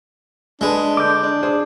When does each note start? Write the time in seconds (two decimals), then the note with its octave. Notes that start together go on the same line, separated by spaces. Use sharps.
0.61 G#3 D4 A4 B4 A5
0.97 D3 D6 G6
1.23 D4
1.43 G#4 C5